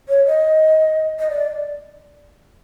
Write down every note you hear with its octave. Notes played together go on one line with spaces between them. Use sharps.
C#5
D#5
D#5
D5